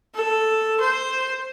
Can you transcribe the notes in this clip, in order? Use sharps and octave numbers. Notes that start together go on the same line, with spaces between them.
A4
C5